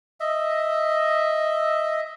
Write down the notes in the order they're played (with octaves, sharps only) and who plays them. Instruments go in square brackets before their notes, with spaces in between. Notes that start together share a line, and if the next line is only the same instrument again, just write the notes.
[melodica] D#5 E5